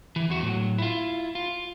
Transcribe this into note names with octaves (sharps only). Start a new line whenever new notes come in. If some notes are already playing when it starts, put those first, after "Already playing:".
E3
E2 F#4
A2 F#3
E4 F4
F4